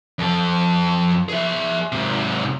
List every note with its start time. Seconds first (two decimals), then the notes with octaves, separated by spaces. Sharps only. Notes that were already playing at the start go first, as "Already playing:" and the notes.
0.19 F2 A4
1.29 G#4 E5
1.92 G#2 C3